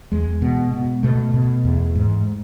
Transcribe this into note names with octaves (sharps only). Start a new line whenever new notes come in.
E2 G#3
B2
B2
B2 A3
B2
E2
G#2